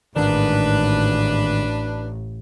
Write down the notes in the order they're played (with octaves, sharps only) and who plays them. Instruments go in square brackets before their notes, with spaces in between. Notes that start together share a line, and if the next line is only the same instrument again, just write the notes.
[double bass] A1 [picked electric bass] G#2 D#3 [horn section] D4 B4